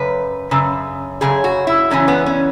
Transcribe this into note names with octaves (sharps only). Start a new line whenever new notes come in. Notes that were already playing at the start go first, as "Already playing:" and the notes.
Already playing: F#2 C#3 B4
F#2 C#3
F#2 C#3 G#4
F#4
E4
F#2 C#3 E3 C#4
B3
C#4